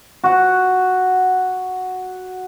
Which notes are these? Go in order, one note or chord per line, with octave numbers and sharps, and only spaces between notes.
F#4 F#5